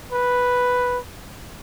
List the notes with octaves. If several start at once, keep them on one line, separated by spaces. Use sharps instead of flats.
B4